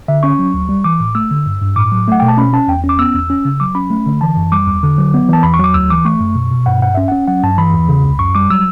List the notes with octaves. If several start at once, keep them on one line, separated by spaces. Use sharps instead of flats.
D3 E5
C#4 C#6
F#3
D2
G3
E3 D6
A2
A3 E6
D3
G2
G2
A2 D6
F#3
A3 F#5
B2 G5
A5
C#4 B5
C#4 A5
E2 G5
C#4
D6
B3 E6
E2
C#4
C#3
F#3 D6
C#4 B5
A3
D3
E3 A5
F#2
G3 D6
E2
D3
F#3
B3
E3 A5
E2 B5
C#6
F#3 D6
D2 E6
E3 D6
A3 C#6
F#2
B2
B2
G2 F#5
G2 F#5
C#4 E5
C#4 F#5
F#3 F#5
G2 A5
E3 B5
E2
C#3
C#2
F#2 C#6
G3 D6
F#3 E6